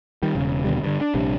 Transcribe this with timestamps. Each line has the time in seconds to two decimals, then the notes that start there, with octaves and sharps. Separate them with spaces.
0.22 D#3 G3
0.35 E1 C#3
0.64 D#2 B2 D3 G3
0.84 G2 D3
1.01 D4
1.14 A#1 C3 G3 D4